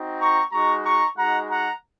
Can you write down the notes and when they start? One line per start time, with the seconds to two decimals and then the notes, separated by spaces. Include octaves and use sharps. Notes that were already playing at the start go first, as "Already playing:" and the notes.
Already playing: C4 D#4 F#4
0.20 A#5 C#6
0.52 G#3 D#4 F#4 A#5 C#6
0.84 A#5 C#6
1.16 G#3 D#4 F#4 F#5 A#5
1.49 F#5 A#5